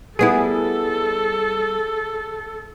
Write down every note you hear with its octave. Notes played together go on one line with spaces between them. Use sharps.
G3 B3 E4 G#4 A4